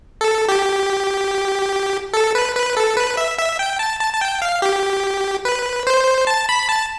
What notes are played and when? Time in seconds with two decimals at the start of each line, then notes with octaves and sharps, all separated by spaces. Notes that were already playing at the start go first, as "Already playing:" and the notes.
0.21 A4
0.48 G4
2.13 A4
2.35 B4
2.56 B4
2.77 A4
2.97 B4
3.17 E5
3.39 E5
3.59 G5
3.79 A5
4.00 A5
4.14 A5
4.21 G5
4.42 F5
4.62 G4
5.45 B4
5.87 C5
6.27 A5
6.49 B5
6.69 A5